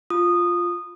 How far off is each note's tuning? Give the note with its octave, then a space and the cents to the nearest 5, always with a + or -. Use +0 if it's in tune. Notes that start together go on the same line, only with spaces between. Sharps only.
F4 +0 D#6 -15